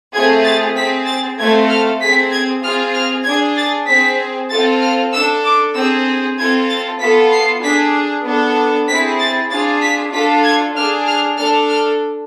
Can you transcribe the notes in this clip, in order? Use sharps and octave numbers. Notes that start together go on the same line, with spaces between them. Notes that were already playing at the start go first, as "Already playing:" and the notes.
A3 C4 F4 G#4 G#6
A6
C4 G#4 B6
A6
A3 C4 F4 A4 G#6
F6
C4 G#4 B6
G#6
C4 F4 G#4 F6
F6
D4 G#4 G#6
A6
C4 G#4 B6
C4 F4 A4 A6
F6
D4 A4 E6
D6
C4 G#4 E6
C4 F4 A4 G#6
A6
B3 F4 A4 B6
C7
D4 G#4 B6
B3 D4 A4
C4 E4 G#4 B6
A6
D4 F4 G#4 A6
B6
D4 F4 A4 B6
G#6
D4 G#4 F6
F6
D4 A4 F6
F6